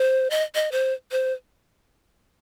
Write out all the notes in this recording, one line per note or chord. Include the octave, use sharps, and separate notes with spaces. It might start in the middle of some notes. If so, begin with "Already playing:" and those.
Already playing: C5
D#5
D#5
C5
C5